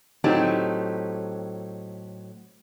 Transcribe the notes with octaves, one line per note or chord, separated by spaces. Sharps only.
A2 F#3 C4 D#4 G4 A5